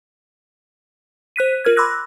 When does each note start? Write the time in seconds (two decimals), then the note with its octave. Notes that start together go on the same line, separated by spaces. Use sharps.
1.36 C5 F#6 B6 D#7
1.65 F4 A#4 F6 G#6
1.76 B5 C6 D6 E6 F#6 A#6